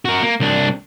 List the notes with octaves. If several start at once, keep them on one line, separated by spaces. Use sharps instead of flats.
F#4 A#4
A#3
C2 D4